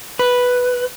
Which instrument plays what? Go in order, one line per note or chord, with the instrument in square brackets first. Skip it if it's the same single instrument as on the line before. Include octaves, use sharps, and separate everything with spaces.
[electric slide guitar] B4